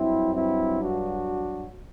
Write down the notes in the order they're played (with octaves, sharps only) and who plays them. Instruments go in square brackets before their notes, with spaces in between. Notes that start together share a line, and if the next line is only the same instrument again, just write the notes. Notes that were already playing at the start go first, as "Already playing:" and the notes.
Already playing: [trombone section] G2 F#3 C4 E4
C4 E4
D4 F#4